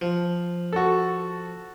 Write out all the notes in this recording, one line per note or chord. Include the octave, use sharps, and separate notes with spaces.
F3
F#4 A4